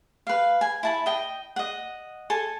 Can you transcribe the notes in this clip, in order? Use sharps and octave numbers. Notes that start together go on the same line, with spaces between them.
B4 F5
G#5
E4 A5 B5
D#5 G5
D#5 F#5
A4 G#5